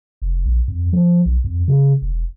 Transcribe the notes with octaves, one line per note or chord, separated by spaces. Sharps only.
F1
A#1
F2
F3
B1
F2
C#3
E1